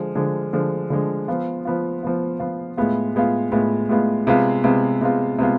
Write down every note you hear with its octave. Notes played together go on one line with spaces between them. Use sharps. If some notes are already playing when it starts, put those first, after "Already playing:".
Already playing: D3 F3 G#3
D3 F3 G#3
D3 F3 G#3
D3 F3 G#3
F3 B3 F4
F3 B3 F4
F3 B3 F4
F3 B3 F4
A2 G#3 B3 F4
A2 G#3 B3 F4
A2 G#3 B3 F4
A2 G#3 B3 F4
C3 G#3 B3 F4
C3 G#3 B3 F4
C3 G#3 B3 F4
C3 G#3 B3 F4